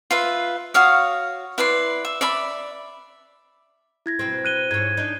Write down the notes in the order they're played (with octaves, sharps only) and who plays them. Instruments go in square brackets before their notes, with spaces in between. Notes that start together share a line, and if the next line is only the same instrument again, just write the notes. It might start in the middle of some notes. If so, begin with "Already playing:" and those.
[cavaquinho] F4 B4 E5
F#4 C#5 F5 D#6
E4 B4 D5 C6
E5
D5 E5 B5
[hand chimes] E4 G#6 A#6
[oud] B2 C4
[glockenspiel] F#6 D#7 G7
[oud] G#2 C#5 [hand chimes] G#6
[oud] D4 D#4